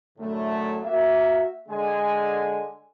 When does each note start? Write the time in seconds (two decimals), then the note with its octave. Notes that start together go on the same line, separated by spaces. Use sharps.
0.17 F#2 A2 D3 A3
0.83 A#3 F#4 E5
1.69 D3 G#3 G#5